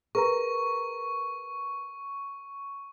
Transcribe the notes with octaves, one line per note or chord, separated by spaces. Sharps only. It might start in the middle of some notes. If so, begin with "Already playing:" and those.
G#4 A#4 B4 A#5 C#6